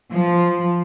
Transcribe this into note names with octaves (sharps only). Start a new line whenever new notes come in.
F3